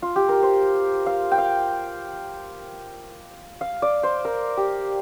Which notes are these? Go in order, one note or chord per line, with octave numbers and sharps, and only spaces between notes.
F4
G4
A#4
C5
F5
G5
F5
F5
D5
C5
A#4
G4